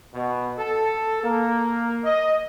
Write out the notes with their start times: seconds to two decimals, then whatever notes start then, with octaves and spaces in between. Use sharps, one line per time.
0.14 B2
0.59 A4
1.24 A#3
2.05 D#5